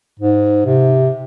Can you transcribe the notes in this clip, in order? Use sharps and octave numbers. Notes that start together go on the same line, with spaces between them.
G#2
C3